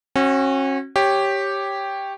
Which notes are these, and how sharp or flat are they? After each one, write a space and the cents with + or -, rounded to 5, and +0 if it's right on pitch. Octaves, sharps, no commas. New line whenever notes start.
C#4 -35 F#4 +0
G4 +0 C#5 -10